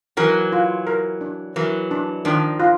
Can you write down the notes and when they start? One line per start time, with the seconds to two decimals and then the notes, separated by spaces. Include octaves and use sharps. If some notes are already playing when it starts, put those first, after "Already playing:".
0.17 E3 F#3 A#4
0.52 F4
0.87 A#4
1.21 D4
1.56 E3 F#3 A#4
1.91 D4
2.25 D#3 F3 D4
2.60 F4